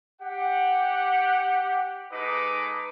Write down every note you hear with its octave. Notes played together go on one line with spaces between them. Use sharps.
G4 F#5
G#3 D#4 A4 B4 D#5 D6